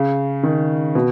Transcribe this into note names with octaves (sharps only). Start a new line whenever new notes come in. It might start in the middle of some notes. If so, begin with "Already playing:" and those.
Already playing: C#3
D#3
B2